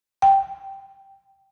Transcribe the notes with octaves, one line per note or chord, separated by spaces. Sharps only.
G5